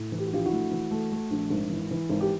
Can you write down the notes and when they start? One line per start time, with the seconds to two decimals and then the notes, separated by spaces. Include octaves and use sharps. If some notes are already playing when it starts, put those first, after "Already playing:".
Already playing: A2
0.12 E3
0.18 G4
0.26 F#4
0.32 A#1 F4 G4
0.46 E4 F#4
0.52 A3
0.71 E3
0.91 A3
1.12 A3
1.31 A#1
1.50 G#1
1.70 E3
1.91 E3
2.10 G#1
2.21 G4